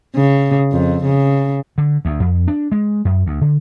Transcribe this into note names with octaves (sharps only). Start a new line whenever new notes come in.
C#3
F2
C#3
D3
D2
F2
D4
G#3
F#2
D2
D3